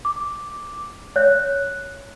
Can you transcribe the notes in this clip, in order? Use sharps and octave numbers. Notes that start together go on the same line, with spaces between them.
D6
C#5 E5 F#6